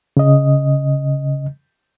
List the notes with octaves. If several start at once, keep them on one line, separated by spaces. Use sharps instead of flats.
C#3 D#5